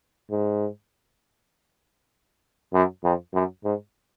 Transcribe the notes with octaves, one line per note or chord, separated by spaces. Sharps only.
G#2
F#2
F2
F#2
G#2